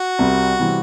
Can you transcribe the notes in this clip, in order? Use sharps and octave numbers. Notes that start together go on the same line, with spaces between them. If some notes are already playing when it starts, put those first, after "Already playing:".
Already playing: F#4
C2 C3 G3 C4
C3 E3 G3 C4